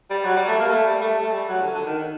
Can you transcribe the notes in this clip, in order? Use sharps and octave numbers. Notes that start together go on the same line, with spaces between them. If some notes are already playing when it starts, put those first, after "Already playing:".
G3
F#3
G3
A3
A#3
A3
G3
A3
A3
G3
F#3
D3
D3
D#3
D#3